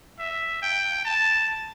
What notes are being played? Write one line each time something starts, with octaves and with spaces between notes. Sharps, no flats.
E5
G5
A5